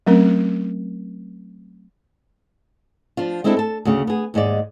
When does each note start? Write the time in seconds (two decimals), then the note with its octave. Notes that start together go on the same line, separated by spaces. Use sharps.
0.07 F#3 A3 C4 C#4 A#4
3.17 F3 D4 F4
3.44 G#3 C4 D4 E4 G#4 A4
3.57 A4 A5
3.85 D2 C#3
4.07 B3 G#4
4.34 D#2 G#2 G#3 D5